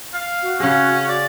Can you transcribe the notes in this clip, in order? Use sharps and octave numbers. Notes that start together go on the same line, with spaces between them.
F5
F#4
C#3 C#4 G#4
D5